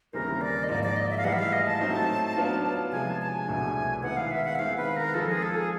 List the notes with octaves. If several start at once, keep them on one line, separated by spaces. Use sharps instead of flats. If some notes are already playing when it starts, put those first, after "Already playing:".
D#2 C#3 E3 G3 C4 A#4
D5
D#5
G#2 F3 A#3 D5
D5
D#5
E5
F5
A2 E3 G3 F#5
E5
F5
D#5
A5
F#3 A3 C4 D#4
F#3 B3 D4 F4
C3 F3 G#3 G#5
A5
A5
G#5
C2 B2 F#3 A3 D4
D#3 G#3 B3 E4 F#5
F5
E5
F#5
E5
D#3 G#3 C4 F5
B4
A#4
F3 G#3 C4 F4 A4
G#4
A4
G#4